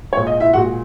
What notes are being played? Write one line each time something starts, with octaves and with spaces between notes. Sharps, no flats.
A#2 G#3 C#5
D#5
E4 E5
A#2 G#3 F#4 F#5